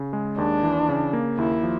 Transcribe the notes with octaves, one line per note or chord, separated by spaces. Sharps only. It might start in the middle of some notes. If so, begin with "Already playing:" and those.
Already playing: C#3
G#3
D#2 D4
E3
C#3
A#3
D#2 E4
F3